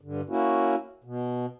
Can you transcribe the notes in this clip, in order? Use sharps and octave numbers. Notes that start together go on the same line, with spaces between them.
G2 D3
A#3 C#4 E4 F#4
B2